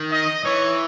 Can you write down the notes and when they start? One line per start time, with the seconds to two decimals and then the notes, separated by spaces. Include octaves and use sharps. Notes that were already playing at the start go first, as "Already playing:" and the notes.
Already playing: D#3
0.12 D#5
0.45 E3 C#5